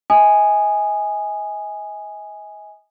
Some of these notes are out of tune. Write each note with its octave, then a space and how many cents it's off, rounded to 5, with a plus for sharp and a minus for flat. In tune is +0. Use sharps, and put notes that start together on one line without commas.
D#5 +45 G#5 +0 D#6 -20